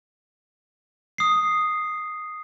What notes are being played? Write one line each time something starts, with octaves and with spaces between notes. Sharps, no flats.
D#6 C7